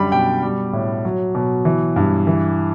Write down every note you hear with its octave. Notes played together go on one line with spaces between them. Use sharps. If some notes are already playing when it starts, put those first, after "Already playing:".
Already playing: F#2 D3 G3 B5
B2 G5
G3
A2
F#3
B2
E3
G2
E3